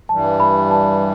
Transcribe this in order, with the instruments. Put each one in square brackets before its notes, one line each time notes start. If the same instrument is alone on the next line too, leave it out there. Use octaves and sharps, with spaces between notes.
[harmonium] G2 E3 G3 [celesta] A5
[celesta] B5
A5